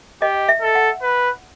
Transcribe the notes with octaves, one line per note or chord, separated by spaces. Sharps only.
G4 D#5
E5
A4
F#5
B4